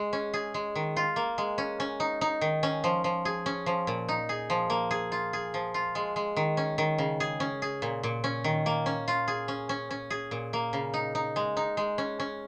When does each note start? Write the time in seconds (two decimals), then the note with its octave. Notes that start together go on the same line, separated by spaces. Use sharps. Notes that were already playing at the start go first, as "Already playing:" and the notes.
Already playing: G#3
0.13 C#4
0.34 G#4
0.54 G#3
0.75 D#3
0.96 F4
1.16 A#3
1.38 G#3
1.58 C#4
1.80 C#4
2.00 D#4
2.21 D#4
2.41 D#3
2.63 C#4
2.84 F3
3.04 F3
3.25 G#4
3.46 C#4
3.66 F3
3.87 A#2
4.08 D#4
4.29 G#4
4.50 F3
4.70 A#3
4.91 G#4
5.12 F4
5.33 G#4
5.54 F3
5.74 F4
5.95 G#3
6.16 G#3
6.36 D#3
6.57 C#4
6.78 D#3
6.98 C#3
7.20 G#4
7.40 C#4
7.62 G#4
7.82 A#2
8.03 A#2
8.24 C#4
8.44 D#3
8.66 A#3
8.86 C#4
9.08 F4
9.28 G#4
9.48 C#4
9.69 C#4
9.91 C#4
10.10 G#4
10.31 A#2
10.53 A#3
10.73 C#3
10.94 D#4
11.15 D#4
11.36 G#3
11.57 D#4
11.77 G#3
11.98 C#4
12.20 C#4